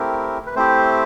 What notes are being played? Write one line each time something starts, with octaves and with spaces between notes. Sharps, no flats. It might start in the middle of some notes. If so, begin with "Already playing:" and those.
Already playing: A3 C4 E4 G4 A#4
B4
A3 C4 E4 G4 C5